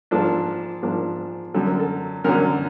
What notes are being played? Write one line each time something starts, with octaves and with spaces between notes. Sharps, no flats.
G#2 F3 A#3 D4 A4
G#2 F3 A#3 D4
F#2 D3 F#3 A4
A#4
A4
F#2 D3 F#3 A#4